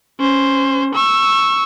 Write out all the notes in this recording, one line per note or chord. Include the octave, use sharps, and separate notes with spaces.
C#4 C5
C#6 E6